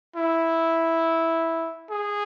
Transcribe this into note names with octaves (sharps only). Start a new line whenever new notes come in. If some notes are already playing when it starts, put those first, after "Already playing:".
E4
G#4